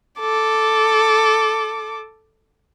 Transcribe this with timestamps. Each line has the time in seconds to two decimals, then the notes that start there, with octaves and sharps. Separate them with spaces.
0.20 A4 D6